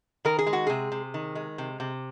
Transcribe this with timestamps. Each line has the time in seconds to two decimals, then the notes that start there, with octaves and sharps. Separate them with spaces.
0.25 D#3 A#4
0.39 G#4
0.47 G#3
0.53 F#4
0.67 C3 G#4
0.92 C3
1.14 D#3
1.35 G#3
1.58 C3
1.80 C3